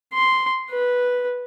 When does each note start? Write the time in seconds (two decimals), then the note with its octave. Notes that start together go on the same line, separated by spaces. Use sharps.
0.13 C6
0.70 B4